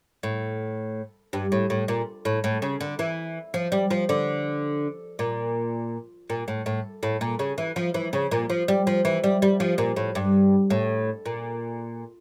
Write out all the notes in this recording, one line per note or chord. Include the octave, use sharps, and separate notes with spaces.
A2
G2
A2
A2
A#2
A2
A2
C#3
D3
E3
F3
G3
F3
D3
A#2
A#2
A2
A2
A2
A#2
C#3
E3
F3
E3
C#3
A#2
F3
G3
F3
E3
G3
G3
F3
A#2
A2
G2
A2
A#2